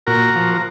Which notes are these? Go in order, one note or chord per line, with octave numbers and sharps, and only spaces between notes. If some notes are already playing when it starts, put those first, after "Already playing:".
A#2 F#4 A#4
F3
A#4